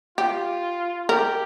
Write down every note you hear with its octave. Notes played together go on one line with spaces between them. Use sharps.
F4 G4
G4 A#4